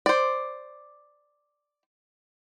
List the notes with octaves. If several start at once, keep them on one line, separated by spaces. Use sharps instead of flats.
C5 D5